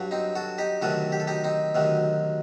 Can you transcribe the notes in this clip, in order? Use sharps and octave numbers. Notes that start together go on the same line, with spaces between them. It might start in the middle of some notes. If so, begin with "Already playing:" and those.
Already playing: G2 F#3
C4 D#4
F#4 A4
D#4 G4
D2 C3 D#3 F#3 F#4 A4
G4
A4
D#4 G4
C4 D#4
D2 C3 D#3 F#3